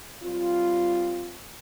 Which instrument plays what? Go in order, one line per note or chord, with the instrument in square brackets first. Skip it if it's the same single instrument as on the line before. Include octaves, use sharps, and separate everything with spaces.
[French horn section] G3 C4 F4